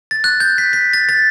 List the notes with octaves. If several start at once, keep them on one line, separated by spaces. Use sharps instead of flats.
A6
F#6
G6
B6
B6
A6
A6